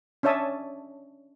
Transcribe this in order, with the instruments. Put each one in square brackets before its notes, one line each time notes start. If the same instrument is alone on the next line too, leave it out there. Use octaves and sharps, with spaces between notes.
[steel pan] C#4 D4 C#5 E5 A5 D#6